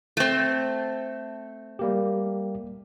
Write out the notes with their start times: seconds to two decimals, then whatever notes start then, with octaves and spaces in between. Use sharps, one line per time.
0.17 A3 C4
1.79 G3 A#3 G4